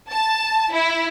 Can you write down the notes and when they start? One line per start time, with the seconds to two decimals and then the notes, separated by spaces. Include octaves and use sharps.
0.11 A5
0.73 E4